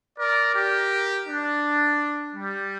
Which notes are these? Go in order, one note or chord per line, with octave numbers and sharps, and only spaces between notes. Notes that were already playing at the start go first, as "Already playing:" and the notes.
A#4 D5
G4 A#4
D4
G3